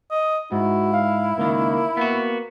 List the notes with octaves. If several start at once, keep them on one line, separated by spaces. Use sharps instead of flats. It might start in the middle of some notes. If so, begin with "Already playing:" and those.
D#5
G#2 E4 F#4
F5
C#2 D#3 A#3
A#3 B3 F#4